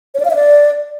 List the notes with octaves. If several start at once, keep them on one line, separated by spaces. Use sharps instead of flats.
C#5
D5
F5
E5
D5